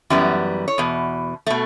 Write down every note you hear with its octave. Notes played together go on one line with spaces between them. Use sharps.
F#2 E3 G3 B3
C#5
E2 B2
B2 A3